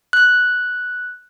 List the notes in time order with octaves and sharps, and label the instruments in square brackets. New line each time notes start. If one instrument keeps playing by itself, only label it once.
[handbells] F#6